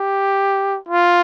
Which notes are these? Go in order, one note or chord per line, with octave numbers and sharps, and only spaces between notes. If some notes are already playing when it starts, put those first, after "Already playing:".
Already playing: G4
F4